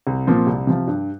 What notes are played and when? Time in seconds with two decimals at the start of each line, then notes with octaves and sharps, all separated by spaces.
0.07 C2
0.27 A#2 F3 C4
0.47 C2
0.67 C3 F3
0.87 G2